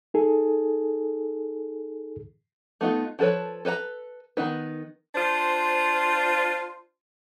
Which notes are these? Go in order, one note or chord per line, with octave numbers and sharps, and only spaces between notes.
D#4 G#4 A4
A3 B3 D#4 F4
F3 F#4 A4 B4 C#5
A4 B4 C5 A#5
D#3 B3 D#4 B4
D4 F4 C5